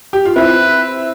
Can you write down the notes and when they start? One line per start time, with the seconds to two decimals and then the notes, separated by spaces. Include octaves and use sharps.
0.13 G4
0.25 F4
0.36 C4 E4 B4